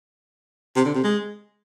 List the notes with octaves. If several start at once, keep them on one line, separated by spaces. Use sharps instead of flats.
C3
D3
C3
G#3